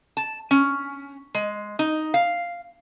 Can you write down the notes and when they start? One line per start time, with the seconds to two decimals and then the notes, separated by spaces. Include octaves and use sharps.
0.17 A5
0.51 C#4
1.35 G#3
1.79 D#4
2.14 F5